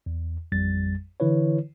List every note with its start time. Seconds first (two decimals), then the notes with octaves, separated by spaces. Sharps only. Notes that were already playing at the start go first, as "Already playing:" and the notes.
0.06 E2
0.52 A1 F2 G3 A6
1.20 D3 E3 E4 B4 C#5